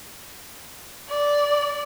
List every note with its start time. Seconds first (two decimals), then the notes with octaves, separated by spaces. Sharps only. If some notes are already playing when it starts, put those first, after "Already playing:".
1.10 D5